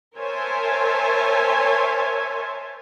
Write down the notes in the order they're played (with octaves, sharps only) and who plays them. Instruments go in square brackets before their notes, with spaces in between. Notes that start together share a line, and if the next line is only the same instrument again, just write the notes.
[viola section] A#4 C5 C#5 E5 G#5 A5